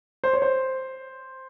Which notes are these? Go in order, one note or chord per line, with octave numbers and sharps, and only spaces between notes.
C5
C#5
C5